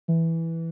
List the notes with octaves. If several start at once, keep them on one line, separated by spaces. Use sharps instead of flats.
E3